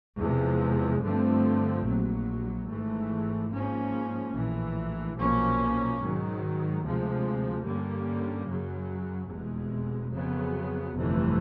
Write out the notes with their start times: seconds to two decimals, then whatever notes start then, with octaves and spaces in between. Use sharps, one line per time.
0.20 E2 C3 F3 G#3
1.03 G2 D3 F3 A3 C4
1.85 A#1 A#2 F#3
2.68 G#1 G#2 E3 A3
3.51 G#2 F3 A#3 C#4
4.34 A#1 A2 E3
5.16 B1 A#2 F3 A#3 C#4
5.99 G#2 D#3 F#3
6.82 D2 C3 F3 G#3
7.64 G2 D3 G3 A#3 C#4
8.47 F#2 C#3 F#3
9.30 F1 E2 B2 G#3
10.13 F2 C#3 F#3 B3
10.95 G1 F2 C3 E3 A3